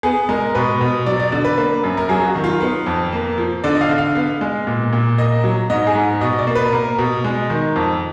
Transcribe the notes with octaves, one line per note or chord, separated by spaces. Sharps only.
B3 G#4
G#3 A#4
B2 B4
B2
F#3 D5
D5
D3 D5
B4
A#3 B4
F#2
A#4
F#3 G#4
F#4
D#3
F4
B3
F2
A#3
F3
D3 D5
D#5
F5
D3
F5
B3
G#3
A#2
A#2
A#3 D#5
F#3
G#2 D#5
G#4
G#2
B2 D#5
D5
A#3
B4
A#3 A#4
B2
G#3
D#3
F2